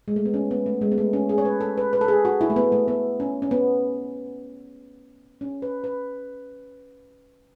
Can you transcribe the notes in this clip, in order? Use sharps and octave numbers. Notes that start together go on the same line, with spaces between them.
G#3
A3
B3
C#4
B3
A3
G#3
B3
A3
C#4
G#4
C#5
B4
A4
B4
B4
A4
G#4
F#4
E4
A3
B3
A3
B3
C#4
C#4
B3
C#4
B4
B4